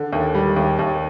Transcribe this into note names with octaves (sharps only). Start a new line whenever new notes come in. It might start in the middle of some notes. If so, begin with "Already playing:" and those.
Already playing: D3
D#2
G3
D#2
D#2